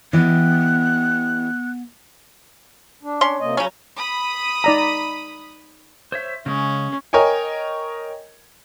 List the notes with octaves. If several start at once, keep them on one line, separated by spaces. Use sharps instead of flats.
E3 B3 G4 D#5 F#6
D4
C#4 C6
C3 A#3 D#5
C#3 F#3 C#4 A#5
B5 D#6
D#4 D5 A#5
C5 C#5 E5
C#3 G#3 C#4
A#4 C#5 D#5 G5 G#5